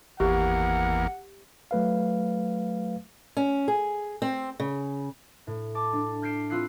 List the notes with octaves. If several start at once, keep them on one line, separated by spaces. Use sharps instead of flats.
G#1 E2 A#3 G4 F#5
F#3 A3 B4 F5
C#4
G#4
C4
C#3
A2
A5 D6
D4
F6 G6 B6 C7 D7 E7
C4 E4 F4 E6 F#6 C7